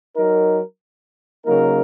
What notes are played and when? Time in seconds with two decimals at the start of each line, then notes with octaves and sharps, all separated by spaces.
0.15 F#3 D#4 A#4
1.44 C#3 F#3 A#3 D#4 A#4